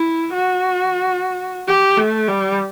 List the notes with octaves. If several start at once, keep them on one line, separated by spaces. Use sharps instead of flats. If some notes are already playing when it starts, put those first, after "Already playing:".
Already playing: E4
F#4
G4
A3
G3